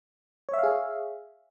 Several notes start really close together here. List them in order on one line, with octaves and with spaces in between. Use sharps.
C#5 E5 F5 G#4